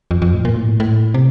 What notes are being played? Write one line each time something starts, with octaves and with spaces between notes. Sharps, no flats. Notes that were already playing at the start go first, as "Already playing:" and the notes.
F2
F2
A2
A#2
A2
A2
C3